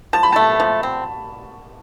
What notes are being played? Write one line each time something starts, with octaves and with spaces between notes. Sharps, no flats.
F3 A5
B5
A3 A5
F3
C4